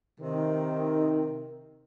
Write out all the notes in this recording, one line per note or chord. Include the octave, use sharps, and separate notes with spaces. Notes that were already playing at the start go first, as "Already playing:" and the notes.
C3 D#3